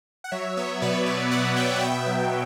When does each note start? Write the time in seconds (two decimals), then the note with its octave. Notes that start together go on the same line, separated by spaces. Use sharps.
0.24 F#5
0.32 F#3 C#5 E5
0.57 B3 C#5 E5
0.82 B2 B4 D5
1.06 B2 B4 D5
1.31 F#3 D5 F#5
1.56 B3 E5 G5
1.76 F#5
1.81 B2 E5 G5
2.06 F#3